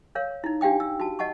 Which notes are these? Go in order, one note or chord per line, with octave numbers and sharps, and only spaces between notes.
A#4 C#5 F5
D#4 E4
D4 G4 F5 G5 D#6
E6
F#4 A5
D#5 F#5 A5 C#6